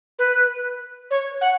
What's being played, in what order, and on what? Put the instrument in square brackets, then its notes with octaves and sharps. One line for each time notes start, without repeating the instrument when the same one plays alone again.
[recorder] B4
C#5
F#5